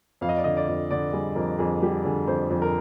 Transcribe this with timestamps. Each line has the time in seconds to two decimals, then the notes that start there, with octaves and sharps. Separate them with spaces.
0.21 F2 F5
0.29 D#5
0.38 D5
0.44 D3 D#5
0.57 D5
0.67 F2
0.91 D3 D5
1.13 G3 G#4
1.36 F2 A#4
1.59 F2 G#4
1.82 G3 G4
2.05 D3 G#4
2.27 F2 C5
2.50 F2
2.62 A#4